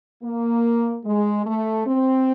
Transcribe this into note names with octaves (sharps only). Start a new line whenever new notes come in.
A#3
G#3
A3
C4